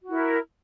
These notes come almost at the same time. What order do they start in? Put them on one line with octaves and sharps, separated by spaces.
F#4 E4 A#4